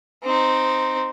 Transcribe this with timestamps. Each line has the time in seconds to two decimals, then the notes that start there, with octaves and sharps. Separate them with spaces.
0.23 C4 D#4